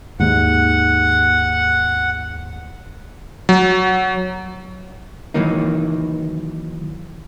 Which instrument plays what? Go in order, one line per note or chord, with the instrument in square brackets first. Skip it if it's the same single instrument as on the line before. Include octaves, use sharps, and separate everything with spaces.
[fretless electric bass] D#2 G#2 [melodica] F#5
[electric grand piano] F#3
[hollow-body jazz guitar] D#3 E3 F#3 A#3 D#4